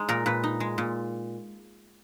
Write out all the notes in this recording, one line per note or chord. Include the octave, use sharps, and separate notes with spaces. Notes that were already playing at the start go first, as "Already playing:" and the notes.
Already playing: G#3 D#4
A#2 A#4
A#2 B4
D#4
G#3
A#2